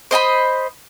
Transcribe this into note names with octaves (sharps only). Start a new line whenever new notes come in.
C5 D#5 G#5 B5